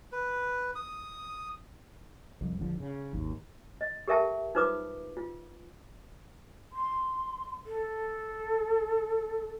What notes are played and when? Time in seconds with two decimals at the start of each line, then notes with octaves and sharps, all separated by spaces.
0.12 B4
0.75 D#6
2.41 C2 F2
2.59 G1 E2 D3 F3
2.80 C#3
3.13 G#1 D#2
3.81 D#5
4.08 G4 A4 A#4 E5 G5 A5
4.55 D#4 F4 B4 C5 D6 D#6
5.17 F4
6.73 C6
7.66 A4